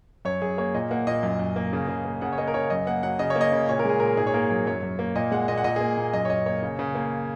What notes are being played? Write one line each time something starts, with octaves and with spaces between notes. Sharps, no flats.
F#2 C#5
F#2 G#4
A#3 C#5
A#2 D#5
A#3 F#5
A#2 D#5
F#2
F#2
A#3
C#3
C#3
A#3
C#3 F#5
C#5
A#3 D#5
A#4
C#3 C#5
F#2 D#5
A#3 F#5
F#3 F#5
C#3 D#5
C#5
A#3
D#5
C#3
A#2 C#5
A#4
G#3 G#4
A#2 A#4
G#2 G#4
C#5
A#3 A#4
F#3 C#5
F#2 C#5
F#2
A#3
A#2 D#5
G#3 F#5
A#2 D#5
F#5
A#2 D#5
A#3 G#4
A#2
F#2 D#5
C#5
F#2 D#5
A#3 C#5
C#3
C#3
A#3